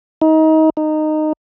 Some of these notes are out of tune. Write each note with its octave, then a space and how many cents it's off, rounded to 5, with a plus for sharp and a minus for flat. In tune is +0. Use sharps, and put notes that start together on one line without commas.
D#4 +25
D#4 -15